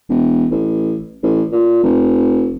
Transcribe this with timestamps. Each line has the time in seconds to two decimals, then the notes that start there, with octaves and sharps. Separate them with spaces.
0.09 E1
0.51 A1
1.23 A1
1.52 A#2
1.84 F1